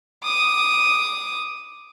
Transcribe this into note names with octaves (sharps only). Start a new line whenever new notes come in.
D6 D#6